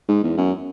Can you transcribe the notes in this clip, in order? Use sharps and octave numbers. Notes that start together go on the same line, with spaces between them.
G#2
E2
F#2